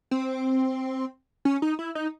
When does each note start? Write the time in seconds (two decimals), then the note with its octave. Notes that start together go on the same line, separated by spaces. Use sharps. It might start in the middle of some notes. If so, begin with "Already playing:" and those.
0.11 C4
1.45 C#4
1.62 D#4
1.79 E4
1.95 D#4